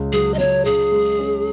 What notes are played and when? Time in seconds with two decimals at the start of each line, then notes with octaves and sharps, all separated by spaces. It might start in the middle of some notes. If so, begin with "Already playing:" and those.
Already playing: C#2 C#3
0.12 F#3 G#4
0.34 D#5
0.39 C#2 C#5
0.65 C#3 G#4
0.92 G#3
1.19 C#4